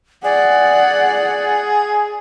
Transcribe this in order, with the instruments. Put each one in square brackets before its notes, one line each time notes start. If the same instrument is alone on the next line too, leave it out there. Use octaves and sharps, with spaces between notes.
[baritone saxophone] G#4 [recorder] D5 [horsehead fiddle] F#5